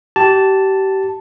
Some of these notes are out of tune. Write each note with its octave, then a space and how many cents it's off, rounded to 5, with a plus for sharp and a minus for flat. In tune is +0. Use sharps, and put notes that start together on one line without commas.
G4 -30 A5 +0